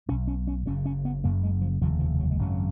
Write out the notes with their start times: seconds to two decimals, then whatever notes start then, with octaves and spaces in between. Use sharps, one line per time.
0.09 B1 B2 C#4
0.28 C#4
0.47 C#4
0.66 F#1 F#2 C#3 C#4
0.86 C#4
1.05 B3
1.24 F#1 F#2 C#3 A#3
1.43 G#3
1.61 F3
1.81 F1 D#2 C#3 F3
2.00 F3
2.20 F#3
2.31 G#3
2.39 G#1 F#2 C#3 F#3